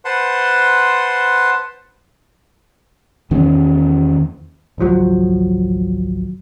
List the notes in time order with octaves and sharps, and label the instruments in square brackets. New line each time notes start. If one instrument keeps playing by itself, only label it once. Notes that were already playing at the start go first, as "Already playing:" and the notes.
[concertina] B4 C5 F#5 A5 C6
[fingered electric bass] E2 D#3 C#4
[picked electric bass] G#1 C#2 F3 F#3